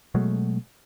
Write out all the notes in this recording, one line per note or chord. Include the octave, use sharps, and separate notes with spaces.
B2 F#3 G#3 A3